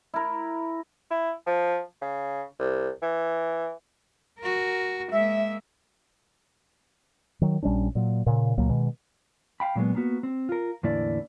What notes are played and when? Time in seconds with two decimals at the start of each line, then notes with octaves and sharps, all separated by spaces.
0.14 E4 A#4
1.10 E4
1.46 F3
2.02 C#3
2.59 C2
3.02 E3
4.39 F#4 A#4
5.12 G#3 A#3 E5
7.42 D#3 F#3
7.63 A#1 G3 C#4 D4
7.95 A#2 F#3
8.26 A#2 C#3
8.58 C#2 A#2 F#3 A#3
8.69 B2 D#3 G#3
9.60 F5 G5 B5
9.75 A#2 F#3 G#3 B3
9.95 A#3 B3 F#4
10.23 C4
10.49 F4 A#4
10.83 E2 A2 D3 A#3 E4 D5